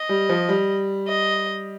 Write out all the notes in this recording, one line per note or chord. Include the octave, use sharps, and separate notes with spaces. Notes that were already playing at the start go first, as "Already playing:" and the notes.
Already playing: D#5
G3
F3
G3
D#5